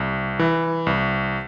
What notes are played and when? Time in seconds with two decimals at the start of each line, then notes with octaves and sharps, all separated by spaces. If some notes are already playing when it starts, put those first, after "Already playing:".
Already playing: C2
0.39 E3
0.86 C2